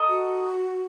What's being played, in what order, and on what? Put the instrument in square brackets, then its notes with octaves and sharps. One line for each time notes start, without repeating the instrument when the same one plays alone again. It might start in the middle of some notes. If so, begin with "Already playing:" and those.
Already playing: [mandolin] D#4 A4 D#5
[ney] F#4